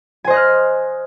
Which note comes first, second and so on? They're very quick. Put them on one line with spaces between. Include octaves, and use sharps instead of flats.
G#5 C5 D#5 F#6 F6